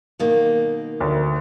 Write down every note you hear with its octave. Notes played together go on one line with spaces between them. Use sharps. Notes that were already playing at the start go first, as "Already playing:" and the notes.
B2 D#3 A#3
D2